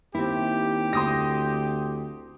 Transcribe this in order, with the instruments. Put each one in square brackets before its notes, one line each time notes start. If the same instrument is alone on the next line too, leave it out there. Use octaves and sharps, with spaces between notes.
[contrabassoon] D#2 [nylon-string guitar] C4 E4 [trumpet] G4
[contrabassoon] D2 [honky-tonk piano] C6 D#6 A#6